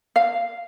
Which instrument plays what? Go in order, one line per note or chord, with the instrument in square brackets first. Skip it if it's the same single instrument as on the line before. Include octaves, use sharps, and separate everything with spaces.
[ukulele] F5